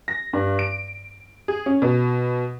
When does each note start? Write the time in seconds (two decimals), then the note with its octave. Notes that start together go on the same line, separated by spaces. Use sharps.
0.08 A#6
0.33 G2
0.59 D7
1.48 G#4
1.66 C#4
1.82 B2